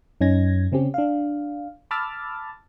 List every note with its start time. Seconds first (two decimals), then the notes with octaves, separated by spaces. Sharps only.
0.21 F#2 C#4 D#4 G#6 A#6
0.72 C#3 C4 C#4 G4
0.94 D4 F5
1.91 A5 B5 D6 E6 F6 A6